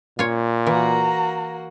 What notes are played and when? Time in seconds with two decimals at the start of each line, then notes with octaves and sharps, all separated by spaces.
0.19 A#2 F4 C#5
0.67 E3 A#3 F#4 A#5